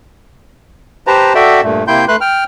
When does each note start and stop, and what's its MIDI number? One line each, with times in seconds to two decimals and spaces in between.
1.07 1.33 67
1.07 1.33 71
1.07 1.33 72
1.07 1.33 81
1.07 1.33 82
1.35 1.61 66
1.35 1.61 69
1.35 1.61 74
1.35 1.61 76
1.35 1.61 79
1.64 1.84 43
1.64 1.84 46
1.64 1.84 57
1.88 2.05 48
1.88 2.05 58
1.88 2.05 64
1.88 2.05 79
1.88 2.05 84
1.88 2.05 91
2.08 2.16 57
2.08 2.16 71
2.08 2.16 84
2.08 2.16 90
2.21 2.44 79
2.21 2.44 89